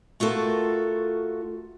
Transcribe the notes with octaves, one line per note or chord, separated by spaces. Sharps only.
A3 F4 F#4 A4 A#4